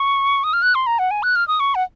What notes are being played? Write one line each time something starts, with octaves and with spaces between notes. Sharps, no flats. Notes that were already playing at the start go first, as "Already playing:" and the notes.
Already playing: C#6
D#6
F6
F#6
C6
A#5
F#5
G#5
F#6
F6
D#6
C#6
F#5